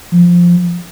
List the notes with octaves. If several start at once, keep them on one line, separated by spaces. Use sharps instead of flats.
F3